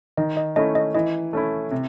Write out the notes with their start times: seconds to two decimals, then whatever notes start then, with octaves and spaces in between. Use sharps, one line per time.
0.17 D#3 D#5
0.37 D#5
0.56 A3 C#4 E4 D#5
0.75 D#5
0.95 E3 D#5
1.33 A3 C#4 E4
1.71 C3